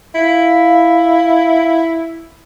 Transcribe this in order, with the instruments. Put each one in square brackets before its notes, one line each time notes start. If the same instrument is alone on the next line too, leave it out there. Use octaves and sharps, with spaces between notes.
[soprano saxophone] E4 [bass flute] F5